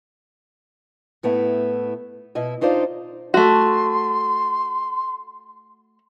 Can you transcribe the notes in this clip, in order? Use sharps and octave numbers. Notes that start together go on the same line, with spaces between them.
A2 A3 B3 E4
B2 E4 D#5
D4 D#4 F4 C5 D5
A3 F#4 C6